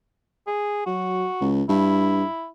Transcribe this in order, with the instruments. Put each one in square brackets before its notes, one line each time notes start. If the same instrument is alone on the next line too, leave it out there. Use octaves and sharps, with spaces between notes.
[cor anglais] G#4
[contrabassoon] F#3 [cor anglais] F#4
[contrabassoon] C#2
[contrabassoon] G2 [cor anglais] E4